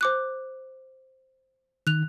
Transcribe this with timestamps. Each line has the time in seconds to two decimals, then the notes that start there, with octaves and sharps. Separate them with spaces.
0.01 C5 D6 F#6
1.87 D#3 F#6 F7